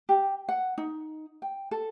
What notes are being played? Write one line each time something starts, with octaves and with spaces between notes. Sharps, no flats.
G4
F#5
D#4
G5
A4